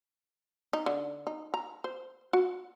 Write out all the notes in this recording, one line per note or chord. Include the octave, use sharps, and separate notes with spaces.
D#4
D3
D#4
A#5
C5
F#4